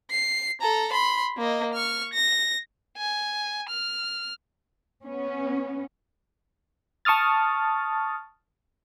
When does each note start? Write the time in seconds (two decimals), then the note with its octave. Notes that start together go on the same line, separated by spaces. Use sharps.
0.11 C7
0.61 A4 A#5
0.92 B5 C6
1.37 A#3 D#5
1.74 C#6 F6
2.14 A#6
2.98 G#5
3.70 F6
5.04 B3 C#4
7.05 A5 C#6 D#6 F6 A6